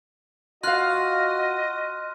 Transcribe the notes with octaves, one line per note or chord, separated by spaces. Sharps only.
F4 F#4 D#5 F5 C6 F6 F#6